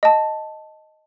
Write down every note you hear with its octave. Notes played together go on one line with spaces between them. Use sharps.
D#5 A5